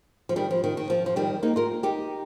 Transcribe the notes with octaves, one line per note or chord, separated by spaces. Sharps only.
F3
D#3 G3
F3
D#3
D#3
F3
F3
D#3 G3
A#3 D#4
F4 A#4
D#4 G4